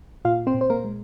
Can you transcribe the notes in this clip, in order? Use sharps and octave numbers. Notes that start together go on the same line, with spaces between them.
A#2 F4 F5
C4 C5
A#2
C5
A#3 A#4
G#3